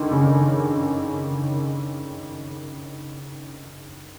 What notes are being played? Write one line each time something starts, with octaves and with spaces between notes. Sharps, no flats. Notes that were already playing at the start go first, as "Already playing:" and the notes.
Already playing: D3 D#3
C#3